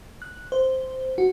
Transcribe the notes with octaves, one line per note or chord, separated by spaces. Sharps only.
F#6
C5
F#4